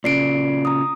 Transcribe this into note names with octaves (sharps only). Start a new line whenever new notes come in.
A#2 C#3 D5 C7 D7
A#5 D#6